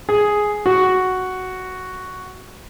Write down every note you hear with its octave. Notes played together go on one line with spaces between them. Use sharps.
G#4
F#4